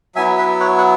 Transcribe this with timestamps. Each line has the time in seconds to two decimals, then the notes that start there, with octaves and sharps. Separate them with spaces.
0.15 F#3 B3 E4 E5 G#5
0.37 B4 E5
0.60 C#5 F#5
0.78 F#5